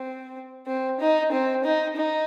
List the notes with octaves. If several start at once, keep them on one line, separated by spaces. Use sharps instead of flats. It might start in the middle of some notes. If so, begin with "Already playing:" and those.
Already playing: C4
C4
D#4
C4
D#4
D#4